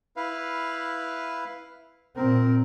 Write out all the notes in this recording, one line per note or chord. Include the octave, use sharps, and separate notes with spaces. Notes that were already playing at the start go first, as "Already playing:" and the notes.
E4 B4 F5
A#2 C4 A#4